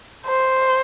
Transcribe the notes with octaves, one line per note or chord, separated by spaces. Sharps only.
C5